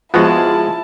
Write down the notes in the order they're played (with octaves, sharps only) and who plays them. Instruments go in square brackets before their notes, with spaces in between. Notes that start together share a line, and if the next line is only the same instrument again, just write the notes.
[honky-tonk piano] F3 G#3 [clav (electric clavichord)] B3 F#4 [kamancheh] E4 A5